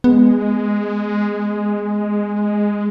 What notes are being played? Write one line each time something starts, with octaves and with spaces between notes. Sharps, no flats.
G#3 B3